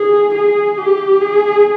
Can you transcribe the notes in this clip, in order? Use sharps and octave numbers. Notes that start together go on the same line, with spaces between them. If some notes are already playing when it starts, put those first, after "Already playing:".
Already playing: G#4
G#4
G4
G#4